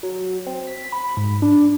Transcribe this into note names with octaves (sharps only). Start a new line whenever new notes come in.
F#3
C4
B6
B5
G#2
D4